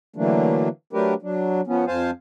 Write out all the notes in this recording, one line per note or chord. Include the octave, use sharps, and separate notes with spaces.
D3 E3 F#3 A3 A#3 D4
F#3 A3 D4 G4 A#4 B4
F#3 D4
F3 B3 C#4
F2 C5 F5 G#5 A5